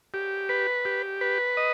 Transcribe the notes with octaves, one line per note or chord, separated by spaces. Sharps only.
G4
B4
G4
B4
D#5